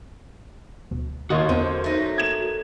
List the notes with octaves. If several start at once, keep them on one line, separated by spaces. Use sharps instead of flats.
D2 B2
D#2 F#4 A#4 C#5 D#5 F#5 C6 D#6
E2 D3 B3 C4 C5
A3 D#4
G#6 E7